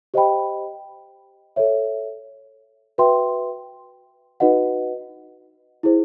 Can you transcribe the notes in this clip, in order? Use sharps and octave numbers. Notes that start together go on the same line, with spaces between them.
G4 C5 D#5 G5 B5
A4 C#5 E5
F#4 B4 E5 G5 C6
D#4 F#4 B4 D#5 F#5
E4 G#4 C5